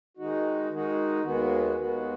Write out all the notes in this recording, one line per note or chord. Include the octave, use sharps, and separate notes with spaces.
D#3 G#3 D#4 F#4
D#3 G#3 D#4 F#4
D#2 D#3 G#3 B3 F#4
D#2 D#3 G#3 B3 F#4